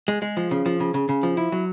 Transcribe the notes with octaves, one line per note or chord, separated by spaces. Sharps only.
G#3
G#3
F3
C#3
F3
C#3
C#3
C#3
F3
E4
F#3